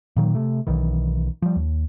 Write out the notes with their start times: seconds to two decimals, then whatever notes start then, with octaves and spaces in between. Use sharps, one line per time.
0.16 A#2 D#3 E3 F#3
0.35 C3 A3
0.67 B1 D#3 E3
1.42 F3 G3
1.56 D#2